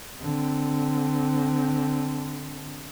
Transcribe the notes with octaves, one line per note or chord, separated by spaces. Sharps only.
D3 C4